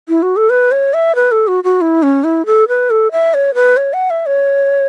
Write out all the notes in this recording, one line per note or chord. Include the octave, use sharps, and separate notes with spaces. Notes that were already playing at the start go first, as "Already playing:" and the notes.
E4
F#4
A4
B4
C#5
E5
B4
A4
F#4
F#4
E4
C#4
E4
A4
B4
A4
E5
C#5
B4
C#5
F#5
E5
C#5